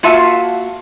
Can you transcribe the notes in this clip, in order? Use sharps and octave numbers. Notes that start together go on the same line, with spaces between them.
A#3 F4 F#4 E5 F5 A5